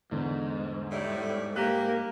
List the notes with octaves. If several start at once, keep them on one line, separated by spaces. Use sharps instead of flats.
E2 G#2 D3 D4
A2 G3
A#3 G4 A#4 F#6 B6 D#7